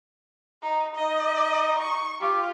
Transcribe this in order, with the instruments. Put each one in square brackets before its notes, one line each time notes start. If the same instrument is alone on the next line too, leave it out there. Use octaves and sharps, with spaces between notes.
[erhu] D#4
[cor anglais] D#4 [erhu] D#5
[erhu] C#6
[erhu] F4 [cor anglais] G4